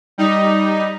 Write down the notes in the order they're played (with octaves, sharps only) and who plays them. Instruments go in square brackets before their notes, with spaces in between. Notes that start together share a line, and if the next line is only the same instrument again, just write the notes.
[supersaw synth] G3 D#4